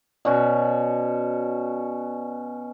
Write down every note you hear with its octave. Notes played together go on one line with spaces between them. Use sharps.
B2 C#4 F#4 D5